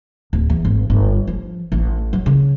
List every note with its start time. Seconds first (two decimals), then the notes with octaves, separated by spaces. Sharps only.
0.33 D1
0.50 E2
0.65 G#1
0.90 G1
1.27 F3
1.72 A1
2.13 F#3
2.26 C#3